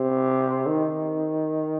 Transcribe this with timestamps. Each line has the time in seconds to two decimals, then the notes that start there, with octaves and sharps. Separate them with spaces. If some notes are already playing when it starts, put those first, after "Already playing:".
Already playing: C3
0.66 D#3